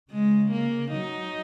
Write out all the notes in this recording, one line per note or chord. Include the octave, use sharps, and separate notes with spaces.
C#3 G#3
A#3
F#3 D#4